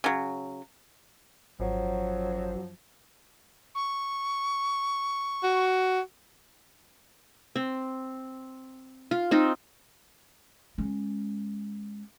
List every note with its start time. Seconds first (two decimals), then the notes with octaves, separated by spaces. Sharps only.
0.04 C#3 F#3
1.60 G#1 F#2 F3 F#3
3.75 C#6
5.43 F#4
7.56 C4
9.11 F4
9.31 C4 D#4 F4
10.78 G#3 C#4